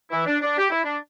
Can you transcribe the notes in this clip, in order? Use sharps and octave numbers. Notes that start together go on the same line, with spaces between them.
E3 E4
D4
D4
G4
E4
D4